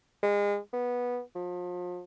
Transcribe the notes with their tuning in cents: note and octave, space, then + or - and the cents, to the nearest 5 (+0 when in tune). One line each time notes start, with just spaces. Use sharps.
G#3 -30
B3 -10
F3 +35